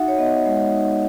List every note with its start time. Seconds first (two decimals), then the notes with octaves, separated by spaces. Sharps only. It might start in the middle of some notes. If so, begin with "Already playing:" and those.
Already playing: D#4 F#4 E5 F#5
0.08 C#5
0.18 B3 D#5
0.46 G#3
0.72 D#4